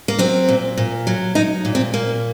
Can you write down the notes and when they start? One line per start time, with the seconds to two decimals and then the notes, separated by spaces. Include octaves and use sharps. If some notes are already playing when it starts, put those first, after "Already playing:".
0.08 A#3
0.19 F#3 C4
0.49 A#2
0.78 A#2
1.07 F#3
1.35 F#3 D#4
1.65 A#2
1.75 C4
1.94 A#2 A#3